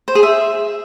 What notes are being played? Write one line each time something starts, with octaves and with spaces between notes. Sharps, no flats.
C5
G#4
E5